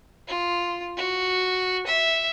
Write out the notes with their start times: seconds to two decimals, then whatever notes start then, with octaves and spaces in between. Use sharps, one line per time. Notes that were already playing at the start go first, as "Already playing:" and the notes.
0.28 F4
0.97 F#4
1.87 E5